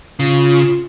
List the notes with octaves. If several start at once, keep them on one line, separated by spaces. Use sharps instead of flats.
C#3 F4